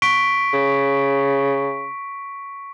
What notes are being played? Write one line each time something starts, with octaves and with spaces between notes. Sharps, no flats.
C#6 B6 D7
C#3